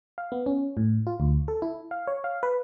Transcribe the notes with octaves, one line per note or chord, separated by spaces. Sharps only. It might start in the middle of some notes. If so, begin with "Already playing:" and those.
F5
B3
C#4
A2
F4
D2
A4
E4
F5
C#5
F5
B4